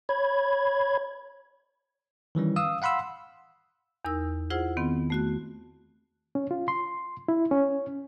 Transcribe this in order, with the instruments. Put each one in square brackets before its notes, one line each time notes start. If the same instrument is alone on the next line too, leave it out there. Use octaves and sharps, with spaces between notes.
[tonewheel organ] C#5 B5 G#6
[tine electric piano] D#3 E3 G3 C#4
F5 D#6 E6
F5 F#5 B5 C6 E6
[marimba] E2 D#4 A#4 E6
E4 F4 G#4 C5 F#5
D#3 B3 C4
A3 F#4 F#6
[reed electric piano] C#4
F4
C6
E4
C#4